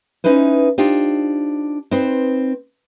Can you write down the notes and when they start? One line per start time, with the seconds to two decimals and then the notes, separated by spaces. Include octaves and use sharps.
0.24 C#4 D#4 E4 B4 C5
0.78 D4 D#4 F4 G4 C5
1.91 C4 D#4 B4 C5